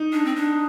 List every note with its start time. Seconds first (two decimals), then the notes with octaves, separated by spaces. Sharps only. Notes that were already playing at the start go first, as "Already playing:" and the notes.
Already playing: D#4
0.13 D4
0.25 C4
0.36 D4